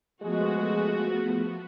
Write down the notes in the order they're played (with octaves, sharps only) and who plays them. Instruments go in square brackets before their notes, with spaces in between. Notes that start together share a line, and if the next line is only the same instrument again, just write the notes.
[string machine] F3 A3 B3 [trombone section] G#3 [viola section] F#4 [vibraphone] G#4